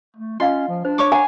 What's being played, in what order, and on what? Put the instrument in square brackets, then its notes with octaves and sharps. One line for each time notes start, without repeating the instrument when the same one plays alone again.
[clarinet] A3
[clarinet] C#4 [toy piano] F4 D#5 F5 [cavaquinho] C6
[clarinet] F3
[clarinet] D4 [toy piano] C5
[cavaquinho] C#5 C#6 D6
[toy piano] F#5 A#5 [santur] G#5